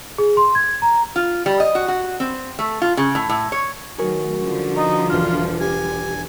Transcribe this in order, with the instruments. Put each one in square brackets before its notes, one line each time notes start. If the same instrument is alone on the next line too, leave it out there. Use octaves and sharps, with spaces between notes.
[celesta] G#4
C6
G#6
A#5
[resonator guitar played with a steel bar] F4
G3
D#5
F#4
F#4
C4
A3
F4
C#3
A2
A2
C#5
[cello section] D#3 F#3 A3 [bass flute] F#4 [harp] G#4 A#4 C#5
[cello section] D3 F3 G3 [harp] C#4
[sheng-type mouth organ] D#4 [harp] D#6
[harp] E1 D4 F6 [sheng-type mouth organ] F4
[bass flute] G4 [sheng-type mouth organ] G#5